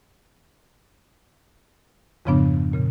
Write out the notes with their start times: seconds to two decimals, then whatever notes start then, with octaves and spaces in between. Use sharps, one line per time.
2.25 F2 G#2 C#3 F3 B3 D4
2.73 A#2 C#3